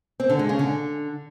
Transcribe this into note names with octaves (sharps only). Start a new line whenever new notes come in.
C4
D3
G#3
C#3
D3